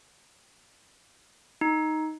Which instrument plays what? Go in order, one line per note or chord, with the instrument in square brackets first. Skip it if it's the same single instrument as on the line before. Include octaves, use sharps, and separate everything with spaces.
[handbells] D#4